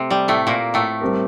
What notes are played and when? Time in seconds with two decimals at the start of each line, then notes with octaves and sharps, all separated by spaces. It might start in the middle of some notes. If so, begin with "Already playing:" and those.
Already playing: C3 A3 C4
0.10 G3
0.28 A2 A3
0.47 A#2 A#3
0.74 A2 A3
1.01 G3 C4 G4 A#4